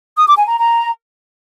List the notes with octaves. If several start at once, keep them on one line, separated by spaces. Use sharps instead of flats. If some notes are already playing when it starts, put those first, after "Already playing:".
D#6
D6
G#5
A#5
A#5